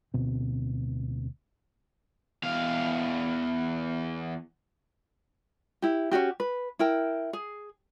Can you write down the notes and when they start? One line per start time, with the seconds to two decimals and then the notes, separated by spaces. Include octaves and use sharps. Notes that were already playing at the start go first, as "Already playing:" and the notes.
0.14 D1 D2 B2 C4
2.43 E2 F5
5.82 E4 G4
6.12 C#4 D#4 F#4 G4
6.40 B4
6.79 E4 A#4 G5
7.33 G#4